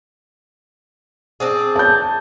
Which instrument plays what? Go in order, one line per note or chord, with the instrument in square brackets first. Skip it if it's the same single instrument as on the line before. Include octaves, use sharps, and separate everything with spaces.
[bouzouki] C4 D4 G#4
[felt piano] A5 G6